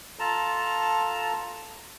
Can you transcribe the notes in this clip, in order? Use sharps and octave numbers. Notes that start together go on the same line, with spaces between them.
F4 A4 A5 A#5